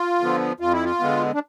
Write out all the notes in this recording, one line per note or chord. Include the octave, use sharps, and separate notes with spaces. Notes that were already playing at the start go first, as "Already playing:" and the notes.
Already playing: F4
D3 F3 B3
F2 F4
E4
F4
D3 G#3 B3
D4